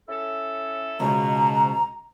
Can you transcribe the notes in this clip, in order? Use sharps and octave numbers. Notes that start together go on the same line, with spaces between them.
C#4 E4 A4
C#2 G#2 B2 A#5